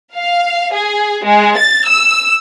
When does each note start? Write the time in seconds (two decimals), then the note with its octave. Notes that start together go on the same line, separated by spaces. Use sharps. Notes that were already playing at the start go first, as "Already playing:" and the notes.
0.15 F5
0.73 G#4
1.24 G#3
1.57 A6
1.86 E6